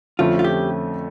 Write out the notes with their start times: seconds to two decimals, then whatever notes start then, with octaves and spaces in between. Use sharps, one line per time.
0.19 F2 D3 F3 A3 C#4 F4
0.39 F4
0.44 G4